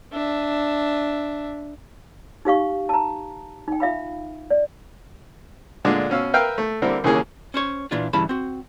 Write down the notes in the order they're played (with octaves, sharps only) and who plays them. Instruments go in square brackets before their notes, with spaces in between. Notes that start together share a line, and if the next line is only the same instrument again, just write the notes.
[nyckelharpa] D4 E5
[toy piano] D#4 G4 F5 C#6
A5 A#5
D#4 G5
F4 E5 F5 B5
D5
[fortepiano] A#2 D3 G#3 D4 F4
B2 C#4 F5 E6
A#4 B4 E5 F5 G5 F6
A3
D3 G3 A#3 C4 E4 A#4
D#2 C#3 E3 A#3 C#4 G#4
[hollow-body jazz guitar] C#4 C5 C#5
A#2 E3 D4 F4
G2 C#3 E3 E4 A5 B5
C4 F#4